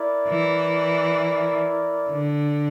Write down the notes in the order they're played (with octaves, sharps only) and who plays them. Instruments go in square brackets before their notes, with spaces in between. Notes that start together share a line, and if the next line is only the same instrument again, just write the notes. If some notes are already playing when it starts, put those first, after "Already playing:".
Already playing: [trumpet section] E4 A#4 D5
[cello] E3
D3